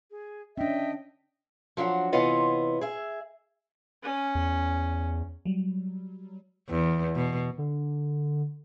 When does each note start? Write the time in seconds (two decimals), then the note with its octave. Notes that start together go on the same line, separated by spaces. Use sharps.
0.12 G#4
0.58 C#4 D4 D#5 E5 G5
1.77 F3 F#3 D4 F#4
2.12 C3 E3 B3 F4 C#5 D#5
2.81 G#4 E5
4.03 C#4
4.35 E2
5.45 F#3 G3
6.70 E2
7.16 B2
7.58 D3